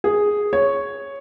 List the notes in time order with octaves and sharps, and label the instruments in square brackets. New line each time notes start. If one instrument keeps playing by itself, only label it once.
[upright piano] G#4
C#5